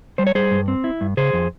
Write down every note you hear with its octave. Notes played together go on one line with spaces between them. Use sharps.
G3 C5
C#5
G3 G#4 C5
G2
C4
E4
G2
C#3 G#4 C5
F2